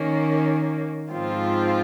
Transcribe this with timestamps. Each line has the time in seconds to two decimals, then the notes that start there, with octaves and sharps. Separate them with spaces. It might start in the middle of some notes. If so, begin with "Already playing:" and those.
Already playing: D#3 A#3 C#4
1.12 G#2 F3 C4 F4